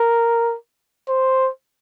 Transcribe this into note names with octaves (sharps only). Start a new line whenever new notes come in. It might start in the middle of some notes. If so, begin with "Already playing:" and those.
Already playing: A#4
C5